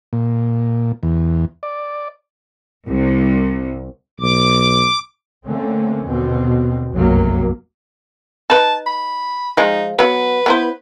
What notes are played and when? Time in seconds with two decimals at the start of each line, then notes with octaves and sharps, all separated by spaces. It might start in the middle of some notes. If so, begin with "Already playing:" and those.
0.13 A#2
1.03 E2
1.63 D5
2.89 C2
4.20 B1 D6
5.46 D3 A3 A#3 C4 C#4
6.05 D#2 B2 D3 C4
6.92 F1 B1 F#2 C3 F#3 A#3
8.50 D#4 B4 A5
8.86 B5
9.57 F3 G#3 D#4
9.99 F#3 B3 B4
10.46 B3 E4 C5